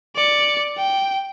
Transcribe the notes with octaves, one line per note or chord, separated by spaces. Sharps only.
D5 C#7
G5